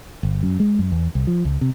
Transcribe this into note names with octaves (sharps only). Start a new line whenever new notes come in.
G1
F#2
G#3
F#2
E2
C2
F3
C#2
C3